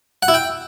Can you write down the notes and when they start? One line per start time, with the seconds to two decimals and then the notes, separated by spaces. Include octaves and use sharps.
0.23 F#5
0.28 E4
0.34 G5